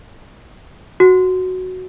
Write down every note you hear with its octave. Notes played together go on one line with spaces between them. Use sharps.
F#4